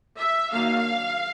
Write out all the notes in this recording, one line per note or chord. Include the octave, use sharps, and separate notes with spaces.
E5
D#3 F#3 A#3 D4 F5